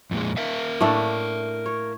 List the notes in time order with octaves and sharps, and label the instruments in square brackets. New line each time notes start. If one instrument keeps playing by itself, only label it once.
[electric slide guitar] F2 A#2 G#3
A#4 E5 F5
[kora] A2 A3 D4
C#5